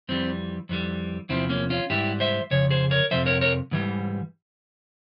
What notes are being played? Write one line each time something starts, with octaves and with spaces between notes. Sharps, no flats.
F2 E3 G3 C4
F2 E3 G3
E2 C3 F3 C4 E4
A#3 C#4
C#4 F4
G#2 E3 G3 E4 G4
C5 E5
F2 C#3 C#5
G#4 C5
A#4 C#5
F2 C3 F3 C5 E5
A#4 C#5
A#4 C#5
G#2 E3 G3